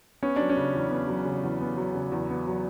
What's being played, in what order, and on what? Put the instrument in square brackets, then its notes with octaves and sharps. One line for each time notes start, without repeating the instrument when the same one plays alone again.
[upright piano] B3 [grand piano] C#4
[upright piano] F#3 [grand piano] D4
[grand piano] C#4
[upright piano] C#3
E2
B3
F#3
C#3
E2
B3
F#3
C#3
E2
B3
F#3